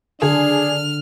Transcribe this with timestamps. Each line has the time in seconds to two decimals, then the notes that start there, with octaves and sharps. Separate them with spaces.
0.22 D3 D4 G#4 F6